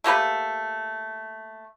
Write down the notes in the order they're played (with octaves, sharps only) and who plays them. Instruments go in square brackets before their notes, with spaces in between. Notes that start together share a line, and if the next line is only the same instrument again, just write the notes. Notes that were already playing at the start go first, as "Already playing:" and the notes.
[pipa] A3 A#3 G4 B4